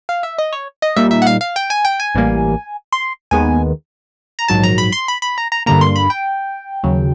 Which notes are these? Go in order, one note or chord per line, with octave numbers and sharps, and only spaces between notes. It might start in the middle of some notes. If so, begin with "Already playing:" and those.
F5
E5
D#5
C#5
D#5
A#2 G3 A#3 D#4 E5
E5
F#5
F5
F5
G5
G#5
G5
G#5
A1 A2 E3 G3 A#3
C6
D#2 D#3 G#3 B3 G#5
A#5
A#1 G#2 D#3 F#3 A5
A#5
B5
C6
B5
B5
A#5
A#5
G2 D3 G3 A#3 A#5
C6
B5
G5
D#2 C#3 F#3